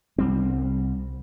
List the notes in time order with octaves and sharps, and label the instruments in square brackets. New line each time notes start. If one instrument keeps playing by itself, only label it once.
[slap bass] C2 G3 C4